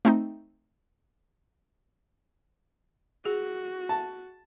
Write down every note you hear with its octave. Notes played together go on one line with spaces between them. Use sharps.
A3 C4 D#4
F#4 G#4
A5